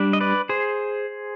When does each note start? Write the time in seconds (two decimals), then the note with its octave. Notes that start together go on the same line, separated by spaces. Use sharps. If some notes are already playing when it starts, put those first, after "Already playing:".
Already playing: G3 D4
0.13 D#5
0.21 B4 D5
0.49 G#4 C5